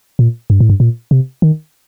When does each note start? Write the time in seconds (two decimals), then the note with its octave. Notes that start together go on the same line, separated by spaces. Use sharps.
0.19 A#2
0.50 G2
0.60 A2
0.70 G2
0.80 A#2
1.11 C3
1.42 D#3